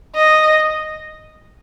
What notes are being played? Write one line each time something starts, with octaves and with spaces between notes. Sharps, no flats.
D#5